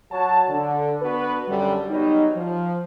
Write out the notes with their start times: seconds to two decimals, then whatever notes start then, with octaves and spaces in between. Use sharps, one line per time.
0.11 F#3 F#4 C#5 A5
0.49 D3
1.01 B3 D4 F#4 B4
1.47 F#2 D3 G3
1.89 F#3 G3 B3 D#4
2.36 F3